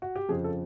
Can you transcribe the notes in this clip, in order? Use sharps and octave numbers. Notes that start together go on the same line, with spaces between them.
F#4
G4
F2 C#3 F3 G#4
A4